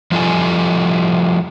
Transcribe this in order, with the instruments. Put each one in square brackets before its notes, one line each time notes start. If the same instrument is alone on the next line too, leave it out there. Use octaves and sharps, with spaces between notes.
[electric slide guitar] F3 G3 F4 A4 G#5